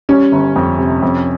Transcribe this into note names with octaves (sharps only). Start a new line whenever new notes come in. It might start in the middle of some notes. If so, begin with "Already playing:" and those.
G3 C#4
G1
F2
C3
F2